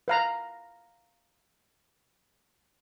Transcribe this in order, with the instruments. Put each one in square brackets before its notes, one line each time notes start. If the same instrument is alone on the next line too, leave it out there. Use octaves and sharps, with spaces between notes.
[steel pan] B4 F5 A#5